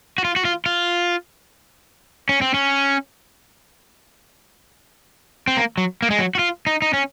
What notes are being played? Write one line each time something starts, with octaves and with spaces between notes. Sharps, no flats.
F#4
F4
F#4
F4
F4
C#4
C4
C#4
C4
A#3
F#3
A#3
G#3
F#3
F#4
F4
D#4
D#4
C#4